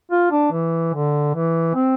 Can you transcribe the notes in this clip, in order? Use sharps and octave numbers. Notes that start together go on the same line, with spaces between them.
F4
D4
E3
D3
E3
C4